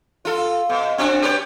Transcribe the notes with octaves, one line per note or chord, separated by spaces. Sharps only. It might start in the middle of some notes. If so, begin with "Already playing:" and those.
F4 A4
B2
C4 D4 F#4
G4 B4 C#5